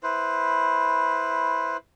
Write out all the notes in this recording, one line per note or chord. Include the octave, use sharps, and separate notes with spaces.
E4 B4 C5